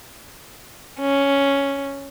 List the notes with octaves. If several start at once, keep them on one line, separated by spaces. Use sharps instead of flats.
C#4